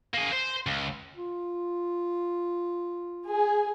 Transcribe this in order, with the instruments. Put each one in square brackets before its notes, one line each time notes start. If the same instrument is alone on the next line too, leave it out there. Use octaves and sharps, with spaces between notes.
[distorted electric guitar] A#3 G#4
C5
C#2
[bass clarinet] F4
[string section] G#4